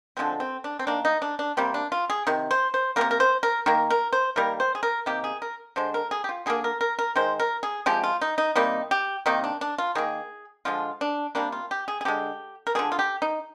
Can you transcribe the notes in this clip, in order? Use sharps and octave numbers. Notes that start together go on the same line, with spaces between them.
D3 F3 G#3 C4
C4
D4
C4
D#3 A#3 D4
D#4
D4
D4
C3 G3 A#3 C4
D4
F4
G#4
C3 D#3
C5
C5
C3 G3 A#3 A#4
A#4
C5
A#4
D#3 A#3 A#4
A#4
C5
D#3 G3 A#3 A#4
C5
G#4
A#4
C3 D#3 A#3 G4
G#4
A#4
D3 G#3 C5
A#4
G#4
G4
F4
D3 G3 A#3 G#4
A#4
A#4
A#4
D#3 G#3 C5
A#4
G#4
C3 F3 G#3 G4
F4
D#4
D#4
C3 G3 A#3 D#4
G4
C3 D#3 A#3 D#4
D4
D4
F4
D#3 A#3 G#4
D3 F3 G#3 F4
D4
C3 G3 A#3 D4
F4
G4
G#4
G#4
D3 G#3 G4
A#4
D3 F3 A#3 G#4
F4
G4
D#4